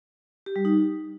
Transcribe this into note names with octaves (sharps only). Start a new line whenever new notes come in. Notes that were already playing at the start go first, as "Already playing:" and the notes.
G4
G3
D#4